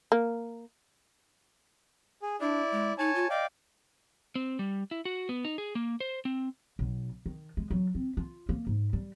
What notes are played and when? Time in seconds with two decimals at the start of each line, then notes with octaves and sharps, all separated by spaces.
0.12 A#3
2.22 G#4
2.41 D4 E4 D5
2.72 G#3
2.98 D#4 C#5 G#5 A5
3.15 F4
3.30 D5 D#5 F5 G5
4.35 C4
4.59 G3
4.91 E4
5.05 F#4
5.29 B3
5.45 D#4
5.58 G#4
5.75 A#3
6.00 C5
6.25 C4
6.79 B1
7.26 D#3
7.57 G#3
7.71 F#3
7.95 C4
8.17 F4
8.49 A#3
8.67 G#2
8.93 G3